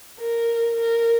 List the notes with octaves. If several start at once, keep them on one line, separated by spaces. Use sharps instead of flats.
A#4
A#4